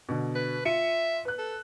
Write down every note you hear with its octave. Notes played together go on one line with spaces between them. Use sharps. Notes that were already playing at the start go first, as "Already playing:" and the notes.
B2 D3
B4
F4 E5 C#7 D#7
B4 F#6
A4